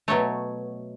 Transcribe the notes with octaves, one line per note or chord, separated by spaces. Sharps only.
B2 F#3 A3 C#5